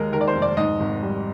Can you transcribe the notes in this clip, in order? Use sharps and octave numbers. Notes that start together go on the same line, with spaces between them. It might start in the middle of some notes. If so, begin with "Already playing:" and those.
Already playing: D#2 G#3 A#4
D#3 A#4
D5
C5
F1
D5
G#2 D#5
G#1
G3